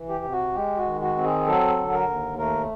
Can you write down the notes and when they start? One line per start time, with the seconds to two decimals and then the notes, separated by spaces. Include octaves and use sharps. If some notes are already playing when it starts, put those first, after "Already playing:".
Already playing: E3
0.09 G4
0.24 C3
0.32 F#4
0.55 G#3 G4
0.78 F#4
0.85 D#3
1.01 F#4
1.16 C4
1.24 G#4
1.46 F#3 A4
1.78 D3
1.93 A#4
2.08 D#2
2.38 A3 A#4